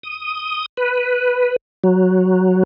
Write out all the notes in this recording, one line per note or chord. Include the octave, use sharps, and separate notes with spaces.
D#6
B4
F#3